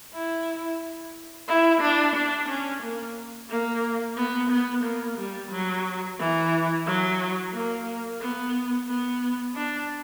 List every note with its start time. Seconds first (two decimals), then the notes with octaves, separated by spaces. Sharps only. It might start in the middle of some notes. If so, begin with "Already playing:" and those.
0.14 E4
1.48 E4
1.81 D4
2.16 D4
2.48 C#4
2.83 A#3
3.50 A#3
4.17 B3
4.50 B3
4.84 A#3
5.18 G3
5.51 F#3
6.19 E3
6.87 F#3
7.53 A#3
8.21 B3
8.88 B3
9.56 D4